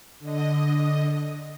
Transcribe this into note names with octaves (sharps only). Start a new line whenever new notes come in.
D3 D#5